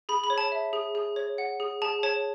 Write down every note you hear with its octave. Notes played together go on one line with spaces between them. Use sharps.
G#4 B5
B5
C#5
A5
E5
G#4
G#4
C#5
F#5
G#4
G#4 A5
C#5 A5